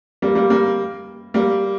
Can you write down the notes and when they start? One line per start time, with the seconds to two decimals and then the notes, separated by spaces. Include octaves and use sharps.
0.22 G3 A#3
0.35 G3 A#3
0.50 G3 A#3
1.34 G3 A#3